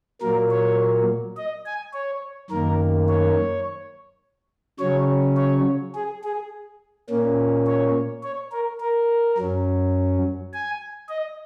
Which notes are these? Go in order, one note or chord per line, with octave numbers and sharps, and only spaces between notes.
A#2 F#3 A#3 A#4
C#5
D#5
G#5
C#5
F#2 D#3 A#3 A#4
C#5
C#3 F#3 C#4 C#5
C#5
G#4
G#4
A#2 A#3 C#4
C#5
C#5
A#4
A#4
F#2 F#3 C#4
G#5
D#5